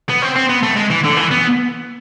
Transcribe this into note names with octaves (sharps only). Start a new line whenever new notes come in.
B3
C4
C4
B3
A3
G#3
E3
D3
E3
B3